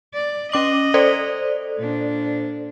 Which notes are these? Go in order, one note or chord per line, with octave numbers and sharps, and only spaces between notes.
D5
C#4 D#5 D6 F#7
A4 C5 D5
A#2 D4